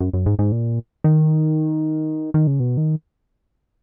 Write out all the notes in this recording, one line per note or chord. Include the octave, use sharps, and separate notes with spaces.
F#2
F#2
G#2
G#2
A#2
D#3
D#3
C#3
B2
D#3